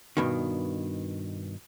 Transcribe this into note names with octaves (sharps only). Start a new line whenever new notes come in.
G2 B2 D#3